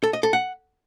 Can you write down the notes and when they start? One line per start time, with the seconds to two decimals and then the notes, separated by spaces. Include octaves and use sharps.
0.03 A4
0.13 D#5
0.23 A4
0.33 F#5